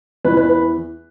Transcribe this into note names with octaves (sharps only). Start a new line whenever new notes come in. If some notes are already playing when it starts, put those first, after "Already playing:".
E2 E3 B4
B4
B4